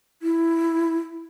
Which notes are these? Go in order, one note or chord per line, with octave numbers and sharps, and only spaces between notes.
E4